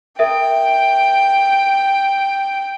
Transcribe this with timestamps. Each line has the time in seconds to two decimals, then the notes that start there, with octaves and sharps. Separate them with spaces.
0.19 A#4 E5 G5